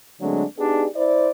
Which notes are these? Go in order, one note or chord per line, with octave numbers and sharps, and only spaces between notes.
D3 F#3 G#3 A3 C4 D4
B3 D4 D#4 G4 G#4 D5
E4 C5 D5